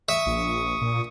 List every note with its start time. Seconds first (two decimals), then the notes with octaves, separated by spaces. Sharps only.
0.09 E5 C#6 D#6
0.26 A#1
0.81 A#2